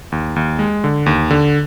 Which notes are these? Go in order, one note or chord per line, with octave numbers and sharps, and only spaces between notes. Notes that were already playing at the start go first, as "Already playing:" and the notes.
D#2
D#2
G#3
D3
D#2
D3